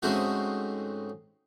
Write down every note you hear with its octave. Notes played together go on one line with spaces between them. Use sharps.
G#2 C#3 A3 C4 D#4 F#4